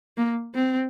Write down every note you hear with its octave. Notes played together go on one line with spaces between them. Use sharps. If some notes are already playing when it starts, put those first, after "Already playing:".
A#3
C4